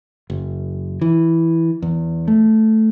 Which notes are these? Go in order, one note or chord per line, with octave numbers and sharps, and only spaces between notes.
F#1
E3
E2
A3